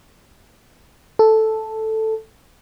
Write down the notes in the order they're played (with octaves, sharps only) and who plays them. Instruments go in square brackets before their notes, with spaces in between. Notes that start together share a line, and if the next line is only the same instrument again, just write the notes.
[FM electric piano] A4